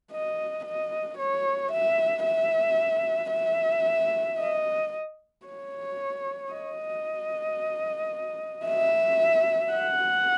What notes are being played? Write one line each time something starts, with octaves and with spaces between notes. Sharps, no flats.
D#5
D#5
C#5
E5
E5
E5
D#5
C#5
D#5
E5
F#5